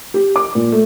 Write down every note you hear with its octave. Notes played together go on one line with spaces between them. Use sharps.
G4
D6
A#2
A3